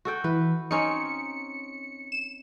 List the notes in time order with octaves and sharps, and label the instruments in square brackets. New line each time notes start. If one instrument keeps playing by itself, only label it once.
[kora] F#4 A4 G5
[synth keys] E3 [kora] B4
[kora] C4 C#4 D#4 [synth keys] C#7
[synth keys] E7